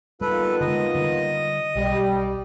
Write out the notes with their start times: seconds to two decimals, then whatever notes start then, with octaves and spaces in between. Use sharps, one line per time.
0.21 D#2 G3 B3 F4 A4 B4
0.61 D3 E3 G#3 D#5
0.95 D3 G3
1.76 B1 G3